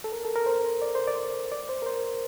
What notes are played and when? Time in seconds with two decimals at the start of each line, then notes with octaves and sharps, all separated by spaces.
0.04 A4
0.12 A#4
0.25 A4
0.36 A#4
0.46 C5
0.82 D5
0.95 C5
1.08 D5
1.52 D5
1.69 C5
1.82 A#4
1.86 C5